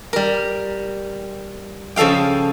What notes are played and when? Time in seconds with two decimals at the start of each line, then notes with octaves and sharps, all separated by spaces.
0.13 G3 A#4
1.96 C#3 F3 A4 F5 G5